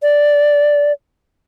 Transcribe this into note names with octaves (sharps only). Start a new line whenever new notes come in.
D5